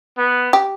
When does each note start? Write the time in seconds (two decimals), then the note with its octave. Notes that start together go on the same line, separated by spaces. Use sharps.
0.18 B3
0.53 G4